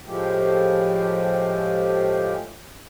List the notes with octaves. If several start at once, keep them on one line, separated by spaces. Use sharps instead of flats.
A2 F3 G#3 A3 G4